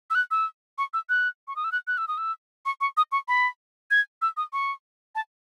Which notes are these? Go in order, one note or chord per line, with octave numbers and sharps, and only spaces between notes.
E6
F#6
E6
C#6
E6
F#6
C#6
D#6
E6
F#6
F#6
E6
D#6
E6
C#6
C#6
D#6
C#6
B5
G#6
E6
D#6
C#6
A5